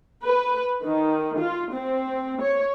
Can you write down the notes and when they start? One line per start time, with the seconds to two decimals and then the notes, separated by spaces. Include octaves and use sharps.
0.24 B4
0.86 D#3
1.38 F4
1.74 C4
2.41 C#5